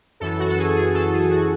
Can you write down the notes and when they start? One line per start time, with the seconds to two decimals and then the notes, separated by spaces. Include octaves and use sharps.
0.20 F#2 E3 A4
0.39 F#4
0.48 A4
0.58 G#4
0.76 G#4
0.94 A4
1.13 G#4
1.30 F#4